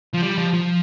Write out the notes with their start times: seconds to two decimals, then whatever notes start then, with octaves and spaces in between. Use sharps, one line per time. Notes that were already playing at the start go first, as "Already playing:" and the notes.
0.14 F3
0.22 G3
0.38 F3
0.53 F3